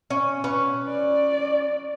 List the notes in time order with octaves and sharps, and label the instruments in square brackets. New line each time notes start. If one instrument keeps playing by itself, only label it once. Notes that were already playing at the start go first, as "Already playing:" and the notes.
[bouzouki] C#4
C#4 B4
[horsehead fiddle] D5